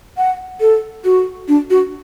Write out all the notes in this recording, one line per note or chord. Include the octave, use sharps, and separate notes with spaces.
F#5
A4
F#4
D4
F#4